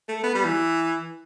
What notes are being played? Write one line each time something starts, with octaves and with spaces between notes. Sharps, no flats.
A3
B3
G3
E3